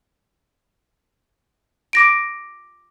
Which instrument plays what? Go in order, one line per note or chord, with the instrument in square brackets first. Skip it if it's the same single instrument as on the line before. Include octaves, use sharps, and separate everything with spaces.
[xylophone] D6 A#6 D7